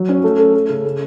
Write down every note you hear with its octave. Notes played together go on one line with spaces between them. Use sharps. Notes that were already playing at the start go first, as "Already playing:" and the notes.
Already playing: F#3
C#4
A3
A4
A3
C#3
A3